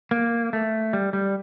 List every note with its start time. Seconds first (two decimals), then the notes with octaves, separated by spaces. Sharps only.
0.11 A#3
0.53 A3
0.93 G3
1.13 G3